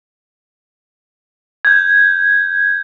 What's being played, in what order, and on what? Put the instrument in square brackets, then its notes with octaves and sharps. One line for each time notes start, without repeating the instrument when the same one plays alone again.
[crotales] G6 G#6